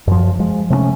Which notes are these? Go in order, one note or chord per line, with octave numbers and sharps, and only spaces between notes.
F#2 F3
F3 G#3
C3 A3 A#3 C#4